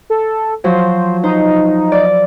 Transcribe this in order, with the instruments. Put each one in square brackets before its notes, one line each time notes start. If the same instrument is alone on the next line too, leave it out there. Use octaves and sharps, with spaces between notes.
[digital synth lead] A4
[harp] F3 F#3 [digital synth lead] C5
[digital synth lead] D#4 [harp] C5
[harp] D5